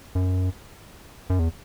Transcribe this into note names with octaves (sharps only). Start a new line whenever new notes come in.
F#2
F#2
E2